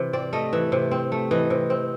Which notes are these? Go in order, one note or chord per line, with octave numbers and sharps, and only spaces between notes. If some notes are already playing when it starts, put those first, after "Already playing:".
Already playing: C3 E3
C4 D5
A3 D#5
E3 E5
C3
C4
A3
E3 D#5
C3
C4